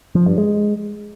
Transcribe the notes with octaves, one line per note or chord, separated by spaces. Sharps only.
F3
G2
G#3